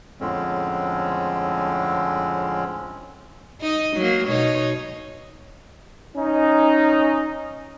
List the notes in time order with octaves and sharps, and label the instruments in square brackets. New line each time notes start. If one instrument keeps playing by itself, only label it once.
[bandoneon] F2 A2 D3 G#3 C4 C#4
[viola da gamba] D#4 D#5
F#3 A#3
B2 D#4 C#5
[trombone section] C#4 D#4